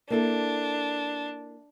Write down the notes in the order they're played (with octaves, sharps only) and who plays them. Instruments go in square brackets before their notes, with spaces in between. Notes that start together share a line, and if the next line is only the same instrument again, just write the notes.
[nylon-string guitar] A#3 E4 A4 [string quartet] D4